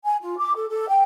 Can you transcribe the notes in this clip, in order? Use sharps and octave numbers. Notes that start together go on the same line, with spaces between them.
G#5
F4
D6
A4
A4
G5